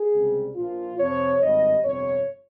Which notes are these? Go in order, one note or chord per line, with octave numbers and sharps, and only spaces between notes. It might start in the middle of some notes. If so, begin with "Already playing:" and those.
Already playing: G#4
C#2 C3 G3
A#1 A#2 F3 F4
F2 C3 F3 C#5
G#1 G2 G3 D#5
G1 F2 C3 C#5